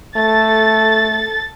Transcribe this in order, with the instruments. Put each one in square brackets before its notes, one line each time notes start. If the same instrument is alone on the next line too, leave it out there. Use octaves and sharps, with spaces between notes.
[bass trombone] A3 [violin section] A4 A6